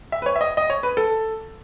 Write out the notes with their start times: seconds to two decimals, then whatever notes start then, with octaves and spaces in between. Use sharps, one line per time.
0.12 E5
0.22 B4
0.26 C#5
0.36 E5
0.41 D#5
0.57 D#5
0.70 C#5
0.83 B4
0.97 A4